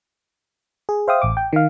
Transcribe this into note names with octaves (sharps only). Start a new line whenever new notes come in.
G#4
C5 E5 F5 G5 D#6
A1 D6
G5
D#3 F5